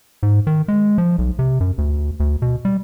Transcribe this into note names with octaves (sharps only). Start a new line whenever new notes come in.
G#2
D#3
G#3
F3
B1
C3
F#2
D2
D2
B2
G3